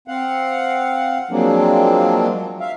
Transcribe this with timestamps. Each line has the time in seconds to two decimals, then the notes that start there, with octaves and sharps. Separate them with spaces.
0.08 C4 F5 F#5
1.31 F3 F#3 G#3 A#3 C4 D4
2.60 E5 F5